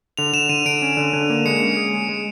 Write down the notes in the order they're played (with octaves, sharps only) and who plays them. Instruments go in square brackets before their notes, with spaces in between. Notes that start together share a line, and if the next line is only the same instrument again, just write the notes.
[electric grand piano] D3 [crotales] F7
[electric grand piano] D3 [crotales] E7
[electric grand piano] D3 [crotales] D#7
[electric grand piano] D3 [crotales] D7
[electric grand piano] C#4
D3
D3
A#3
[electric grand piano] G#3 [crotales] C#7
[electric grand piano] C#4
G#4
G#3
G#3